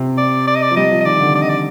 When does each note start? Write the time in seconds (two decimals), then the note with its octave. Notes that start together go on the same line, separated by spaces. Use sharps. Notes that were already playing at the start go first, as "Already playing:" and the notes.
Already playing: C3
0.18 D5
0.47 D5
0.56 D#5
0.63 D5
0.71 F3
0.76 G3 D#5
0.91 F3
1.01 D#5
1.06 D#3 D5
1.21 D3
1.35 D5
1.42 D#5
1.50 D5